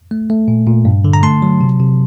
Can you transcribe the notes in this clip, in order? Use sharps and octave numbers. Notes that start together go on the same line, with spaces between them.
A3
A3
A#2
A#2
G2
D3
A#5
A3 A5 C6
F#3
C3
C3